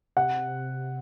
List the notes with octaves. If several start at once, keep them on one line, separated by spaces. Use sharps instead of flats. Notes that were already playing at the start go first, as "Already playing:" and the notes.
C3 F#5